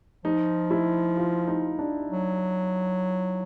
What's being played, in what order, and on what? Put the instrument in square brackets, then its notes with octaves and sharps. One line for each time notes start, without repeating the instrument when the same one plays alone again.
[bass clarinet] F3 [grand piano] D#4
[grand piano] E4
F4
D#4
D4
[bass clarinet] F#3